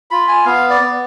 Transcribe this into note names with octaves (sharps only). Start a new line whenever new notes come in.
F4 B5
G#5
B3 F5
D5
B3